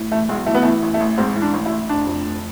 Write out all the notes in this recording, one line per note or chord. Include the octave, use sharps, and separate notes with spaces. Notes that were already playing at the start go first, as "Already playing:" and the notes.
Already playing: A2
E3 A3
B1 G#3
E3 A3
B3
E3 A3
A1
A3
A1
G#2 C4
E3
D4
A1
E4
A1
F1 D4
F2
F1